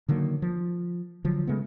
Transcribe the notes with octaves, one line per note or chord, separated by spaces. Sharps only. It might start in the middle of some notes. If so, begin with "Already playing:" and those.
D3 D#3 F#3 A#3
F3
D3 F3 F#3
C#3 G#3 A3 B3